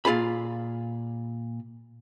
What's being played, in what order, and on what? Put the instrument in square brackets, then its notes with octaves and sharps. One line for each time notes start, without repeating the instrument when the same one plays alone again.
[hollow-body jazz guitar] A#2 F4 G#4 B5